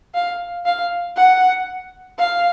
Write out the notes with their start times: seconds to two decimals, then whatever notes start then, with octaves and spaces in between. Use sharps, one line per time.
0.14 F5
0.66 F5
1.16 F#5
2.18 F5